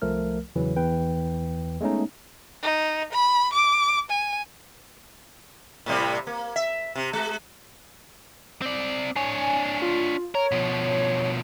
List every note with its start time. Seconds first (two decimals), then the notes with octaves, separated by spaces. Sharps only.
0.02 C2 F3 A3 A#4 F6
0.56 E2 C#3 E3 F#3
0.76 E2 E3 B4 G5
1.81 G#3 A3 B3 C#4 D#4
2.62 D#4
3.13 B5
3.53 D6
4.10 G#5
5.86 A2 C3 G3
6.27 A#3
6.56 E5
6.96 C3
7.13 G#3
8.62 C4 D5
9.16 D4 C#5 G#5
9.82 F4
10.35 A#4 C#5
10.52 B2 F3